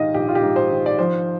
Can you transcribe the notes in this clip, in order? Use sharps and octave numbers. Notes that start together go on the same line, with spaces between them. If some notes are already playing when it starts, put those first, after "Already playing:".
Already playing: A#1 G#2 D#3 G4 D#5 F5
A#1 G4
F4
G4
G#2
C5
D#3
D5
F3 C5